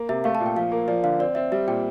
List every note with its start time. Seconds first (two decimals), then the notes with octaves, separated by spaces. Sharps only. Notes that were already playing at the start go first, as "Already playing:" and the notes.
Already playing: A#3
0.09 C3 E5
0.24 A3 F5
0.35 A5
0.40 A#2
0.46 G5
0.56 F3 F5
0.72 A#3
0.88 F3 D5
1.04 D3 F5
1.19 C4 D5
1.35 C4 E5
1.52 G3 E5
1.67 A#2 G5